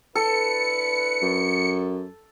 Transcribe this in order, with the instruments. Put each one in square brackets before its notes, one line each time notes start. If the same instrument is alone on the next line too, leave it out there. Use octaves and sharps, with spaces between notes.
[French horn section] D4 E4 B4 [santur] A4 [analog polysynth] C#7
[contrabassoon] F#2